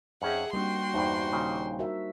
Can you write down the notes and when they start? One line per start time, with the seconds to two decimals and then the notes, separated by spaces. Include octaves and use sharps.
0.22 F2 C#4 D#4 G#4 E5 F#5
0.53 G3 A#3 C4 D4 D#4 F#4 G5 C6
0.94 E2 G2 D#4 C5
1.32 D#2 A#2 C#3
1.79 F#4 A#4 E5